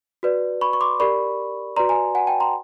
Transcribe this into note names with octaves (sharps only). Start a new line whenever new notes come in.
F#4 B4 D5
B5 C#6
C#6
C6 D6
G4 A#4 D5 B5 C#6
F#4 B4 D5 A#5 C6
G#5 A#5
F#5 G#5
G5 A5
A#5 C6